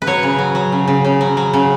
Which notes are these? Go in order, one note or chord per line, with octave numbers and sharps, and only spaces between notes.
B4
F#3 C#5
C#3
F#3
F#3
C#3
C#3
C#3
F#3
F#3
C#3